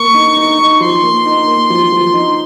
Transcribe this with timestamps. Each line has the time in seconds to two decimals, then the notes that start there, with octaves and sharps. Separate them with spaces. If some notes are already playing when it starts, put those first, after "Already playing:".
Already playing: A#3 C#6
0.14 D#4
0.37 D#4
0.59 D#4
0.80 F3 C6
1.03 A#3
1.26 D#4
1.48 A#3
1.70 F3
1.92 F3
2.14 D#4